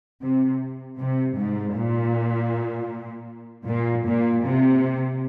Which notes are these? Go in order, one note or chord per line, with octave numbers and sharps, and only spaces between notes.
C3
C3
G#2
A#2
A#2
A#2
C3